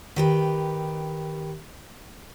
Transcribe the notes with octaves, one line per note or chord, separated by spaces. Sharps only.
D#3 G4 B4